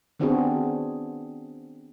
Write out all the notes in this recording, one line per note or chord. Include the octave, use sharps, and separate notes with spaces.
D#3 B3 C4 D4 F#4 G#4